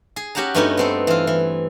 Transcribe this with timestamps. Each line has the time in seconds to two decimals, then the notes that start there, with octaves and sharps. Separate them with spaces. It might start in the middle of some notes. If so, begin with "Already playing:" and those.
0.16 G#4
0.35 C#4 F#4 G4 F#5 A5 A#5
0.55 G2 A3 B3 C#4 D#4 F#4
0.77 B3 C4 A4
1.07 E3 F4
1.27 E3